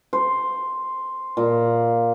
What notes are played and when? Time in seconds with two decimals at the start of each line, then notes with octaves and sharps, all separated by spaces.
0.13 C5
1.37 A#2